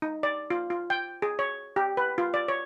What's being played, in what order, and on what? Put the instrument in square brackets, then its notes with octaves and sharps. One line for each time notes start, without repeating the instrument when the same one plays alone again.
[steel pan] D#4
D5
F4
F4
G5
G#4
C#5
G4
B4
F4
D5
C#5